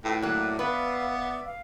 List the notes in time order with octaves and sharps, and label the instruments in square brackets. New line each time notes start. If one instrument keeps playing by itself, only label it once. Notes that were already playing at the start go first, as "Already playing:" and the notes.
[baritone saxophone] A2 [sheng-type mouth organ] F4 B4 [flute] G5
[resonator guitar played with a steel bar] F#3 A#3 [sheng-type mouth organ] D5 E5 [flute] F#6
[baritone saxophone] B3 [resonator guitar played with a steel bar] B4 [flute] F5
[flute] F5